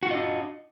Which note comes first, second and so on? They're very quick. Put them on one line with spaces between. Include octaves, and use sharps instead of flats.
F#4 F4 D#5 D4